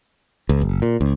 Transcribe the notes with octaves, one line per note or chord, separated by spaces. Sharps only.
C#2
F#1
A#2
C#2